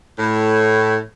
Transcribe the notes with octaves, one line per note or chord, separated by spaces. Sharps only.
A2